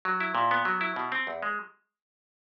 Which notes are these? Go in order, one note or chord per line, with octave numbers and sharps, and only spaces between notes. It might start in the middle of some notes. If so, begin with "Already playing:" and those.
F#3
E4
A#2
B3
F#3
E4
B2
C4
E2
G#3